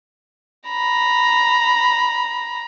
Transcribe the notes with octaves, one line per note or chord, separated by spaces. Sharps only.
A#5 B5